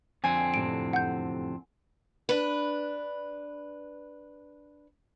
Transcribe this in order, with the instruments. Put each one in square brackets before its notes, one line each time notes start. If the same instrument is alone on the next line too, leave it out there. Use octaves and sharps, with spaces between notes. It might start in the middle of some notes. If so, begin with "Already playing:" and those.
[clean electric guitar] F2 D3 C4 [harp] G#5
[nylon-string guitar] F#2 A2 C3 [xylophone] D7
[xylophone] F#5 G6
[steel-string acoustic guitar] D4 B4